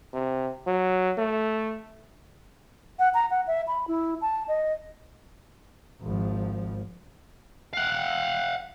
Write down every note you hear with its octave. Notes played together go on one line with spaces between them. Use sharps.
C3
F#3
A3
F#5
A#5
F#5
E5
B5
E4
A5
D#5
G#1 F3
F5 F#5